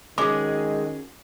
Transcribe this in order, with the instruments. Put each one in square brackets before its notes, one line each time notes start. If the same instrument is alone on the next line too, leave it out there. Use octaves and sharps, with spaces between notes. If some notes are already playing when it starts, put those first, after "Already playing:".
[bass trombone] D#3 [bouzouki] G#3 [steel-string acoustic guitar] C#4 F#4 G#4 [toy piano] D6